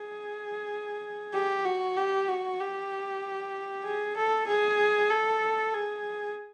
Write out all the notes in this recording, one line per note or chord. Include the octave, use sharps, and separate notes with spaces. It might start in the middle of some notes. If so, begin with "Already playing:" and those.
Already playing: G#4
G4
F#4
G4
F#4
G4
G#4
A4
G#4
A4
G#4